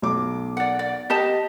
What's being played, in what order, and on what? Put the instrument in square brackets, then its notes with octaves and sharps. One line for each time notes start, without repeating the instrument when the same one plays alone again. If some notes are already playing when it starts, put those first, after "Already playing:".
[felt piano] B1 D6
[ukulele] D5 F#5
D5
G4 D#5 A5